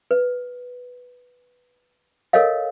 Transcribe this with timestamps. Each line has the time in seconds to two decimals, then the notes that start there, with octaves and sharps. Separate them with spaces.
0.11 B4
2.33 A4 A#4 C#5 D#5 F5